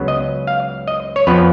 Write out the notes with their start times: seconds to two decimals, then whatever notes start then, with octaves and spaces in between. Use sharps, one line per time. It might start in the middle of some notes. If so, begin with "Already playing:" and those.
Already playing: C#2 C#3 F#3 B3
0.08 D#5
0.47 F5
0.88 D#5
1.16 C#5
1.27 F2 F3 B3 B4